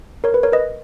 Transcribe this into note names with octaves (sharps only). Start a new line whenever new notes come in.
A#4 C#5
B4
A#4 C#5
B4 D#5